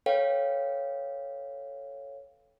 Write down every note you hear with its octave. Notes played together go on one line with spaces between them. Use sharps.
A4 B4 C#5 F5 G5